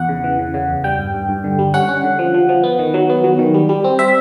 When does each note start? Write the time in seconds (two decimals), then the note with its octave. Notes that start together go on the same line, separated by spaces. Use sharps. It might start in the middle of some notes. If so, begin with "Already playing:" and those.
Already playing: E2 F#5
0.09 C#3
0.24 E3
0.39 C#3
0.54 C#3
0.69 E2
0.84 G3 G5
0.99 G2
1.14 G2
1.29 G2
1.44 D3
1.59 G3
1.74 C#4 F#5
1.88 C#4
2.04 D3
2.19 F3
2.34 F3
2.49 F3
2.64 B3
2.79 D#3
2.94 F#3
3.09 B3
3.24 F#3
3.39 D#3
3.54 G3
3.69 G3
3.84 C4
3.99 C4 E5